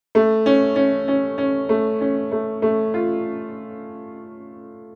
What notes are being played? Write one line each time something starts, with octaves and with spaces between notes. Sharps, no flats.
A3
C#4
C#4
C#4
C#4
A3
C#4
A3
A3
F4